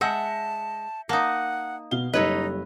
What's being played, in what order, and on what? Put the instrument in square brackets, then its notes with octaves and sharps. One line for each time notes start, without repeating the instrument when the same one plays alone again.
[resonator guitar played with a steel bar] G#3 F#5 [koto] E5 [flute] A5 [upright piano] G6 A#6 C#7
[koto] A#3 D#4 [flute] F#5 [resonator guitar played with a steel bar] A5
[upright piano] B2 G7 [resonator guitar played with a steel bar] F5
[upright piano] F#1 G3 [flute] D#4 [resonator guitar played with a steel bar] A4 C#5 D#5 [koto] B4